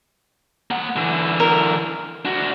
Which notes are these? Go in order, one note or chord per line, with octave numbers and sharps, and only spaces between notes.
A#3 F#5
D3 E3
A#4
D4 F#4